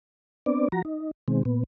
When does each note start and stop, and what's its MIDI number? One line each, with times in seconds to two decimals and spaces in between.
0.46 0.68 59
0.46 0.68 60
0.46 0.68 62
0.46 0.68 74
0.72 0.82 53
0.72 0.82 66
0.72 0.82 82
0.85 1.11 63
1.28 1.43 47
1.28 1.43 51
1.28 1.43 56
1.28 1.43 60
1.45 1.64 46
1.45 1.64 59